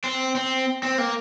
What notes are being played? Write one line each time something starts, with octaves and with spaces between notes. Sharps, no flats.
C4
C4
C4
A#3